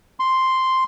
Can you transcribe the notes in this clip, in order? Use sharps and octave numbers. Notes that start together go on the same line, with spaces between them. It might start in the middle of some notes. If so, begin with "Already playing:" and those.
C6